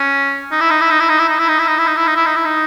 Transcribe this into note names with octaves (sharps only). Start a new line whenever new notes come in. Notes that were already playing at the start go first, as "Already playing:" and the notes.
Already playing: C#4
D#4
E4
D#4
E4
D#4
E4
D#4
E4
D#4
E4
D#4
E4
D#4
E4
D#4
E4
D#4
E4
D#4
E4
D#4